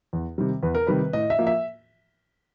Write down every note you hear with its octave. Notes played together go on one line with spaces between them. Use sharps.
E2
C3 D#3 G3
E2 B4
A#4
C3 D#3 G3 B4
A2 D#5
E5
F3 A#3
E5